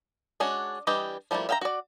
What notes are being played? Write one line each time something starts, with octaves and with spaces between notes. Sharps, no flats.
G#3 C#4 D4 F#4
E3 G3 D4 G4 D#5
F3 G3 A3 A#3 E4
E5 F5 G5 A5 A#5
F#4 D5